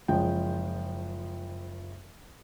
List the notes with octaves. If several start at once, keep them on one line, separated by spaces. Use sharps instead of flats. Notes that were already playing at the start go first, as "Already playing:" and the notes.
F#1 F3 G#3 G5